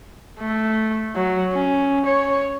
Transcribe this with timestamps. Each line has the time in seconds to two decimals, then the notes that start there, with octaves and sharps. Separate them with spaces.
0.40 A3
1.15 F#3
1.52 C#4
2.06 C#5